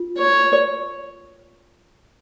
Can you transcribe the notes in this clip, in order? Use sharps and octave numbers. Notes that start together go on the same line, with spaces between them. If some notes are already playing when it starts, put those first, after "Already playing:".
Already playing: F4
C#5